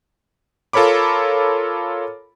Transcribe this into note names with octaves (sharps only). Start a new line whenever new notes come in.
F4 A4 A#4 C#5 B5 D6